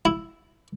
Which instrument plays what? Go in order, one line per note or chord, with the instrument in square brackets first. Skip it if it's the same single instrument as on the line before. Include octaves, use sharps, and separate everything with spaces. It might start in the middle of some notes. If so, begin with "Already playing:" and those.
[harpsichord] E4